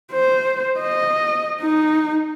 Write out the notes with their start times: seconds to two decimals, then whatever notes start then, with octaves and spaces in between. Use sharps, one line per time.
0.12 C5
0.79 D#5
1.61 D#4